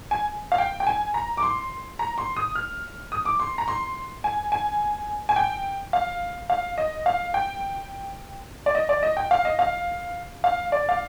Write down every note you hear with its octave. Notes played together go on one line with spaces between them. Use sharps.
G#5
F5
G5
G5
G#5
A#5
D6
C6
A#5
C6
D#6
F6
D#6
D6
C6
A#5
C6
G#5
G#5
G#5
G5
F5
F5
D#5
F5
G5
D5
D#5
D5
D#5
G5
F5
D#5
F5
F5
D5
F5